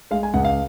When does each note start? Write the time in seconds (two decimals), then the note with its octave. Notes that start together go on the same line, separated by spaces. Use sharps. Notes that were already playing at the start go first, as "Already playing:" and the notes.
0.11 G#3 F5
0.23 G#5
0.34 C#2 F#5
0.45 F5